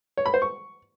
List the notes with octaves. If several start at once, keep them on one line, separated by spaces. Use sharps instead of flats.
C#5
B5
C5
C#6